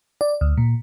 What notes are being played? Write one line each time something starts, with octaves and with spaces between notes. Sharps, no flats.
D5
D2
A#2